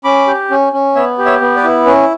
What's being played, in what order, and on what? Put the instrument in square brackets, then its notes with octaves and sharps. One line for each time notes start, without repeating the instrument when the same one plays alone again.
[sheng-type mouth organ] C#4 B5 D6
G4
C#4
C#4
B3 C#5 E5
G4
C#5 E5
B3
B4 D5
E4
C#4 B4